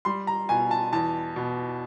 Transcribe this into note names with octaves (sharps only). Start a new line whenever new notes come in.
G3 C6
A#5
B2 G#5
A5
E2 A5
B2